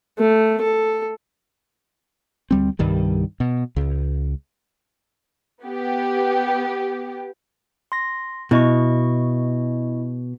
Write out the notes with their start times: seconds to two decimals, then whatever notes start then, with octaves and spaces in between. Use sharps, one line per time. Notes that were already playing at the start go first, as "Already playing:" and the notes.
0.18 A3
0.62 A4
2.51 D2 G3 C4
2.79 C2 G2 D#3 G3
3.40 B2
3.76 C#2
5.63 B3 G4
7.92 C6 A#6
8.51 B2 E4 D#5 C#6